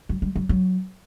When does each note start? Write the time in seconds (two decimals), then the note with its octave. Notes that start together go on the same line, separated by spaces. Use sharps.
0.09 F#3
0.22 G3
0.36 F#3
0.49 F#3